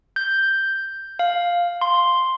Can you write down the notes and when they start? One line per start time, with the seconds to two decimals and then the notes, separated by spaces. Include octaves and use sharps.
0.16 G6
1.19 F5
1.81 C6